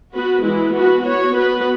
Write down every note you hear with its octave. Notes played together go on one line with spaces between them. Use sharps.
B3 F#4 B4
E3 G#3 E4 B4
B3 F#4 B4
B3 F#4 C#5
B3 F#4 B4